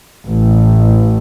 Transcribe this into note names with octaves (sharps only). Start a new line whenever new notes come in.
A1